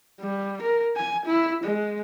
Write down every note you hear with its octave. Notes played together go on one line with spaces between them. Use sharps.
G3
A#4
G#5
E4
G#3